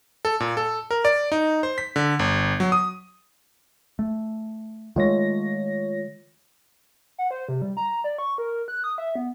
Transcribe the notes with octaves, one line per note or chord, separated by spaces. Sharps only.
A4
A#2
A4
A#4
D5
D#4
C5
B6
D3
G1
F#3
D#6
A3
D#3 G#3 A3 F4 C#5 A#6
F#5
C5
C3
G3
A#5
D5
C#6
A#4
F#6
D#6
E5
B3